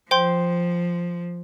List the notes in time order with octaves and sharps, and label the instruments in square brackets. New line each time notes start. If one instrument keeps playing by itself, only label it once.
[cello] F3 [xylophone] C5 G5 C6 G6